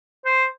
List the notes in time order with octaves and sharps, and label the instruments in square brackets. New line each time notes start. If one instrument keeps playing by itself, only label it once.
[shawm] C5